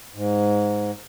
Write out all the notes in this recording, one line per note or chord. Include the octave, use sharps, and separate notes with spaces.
G#2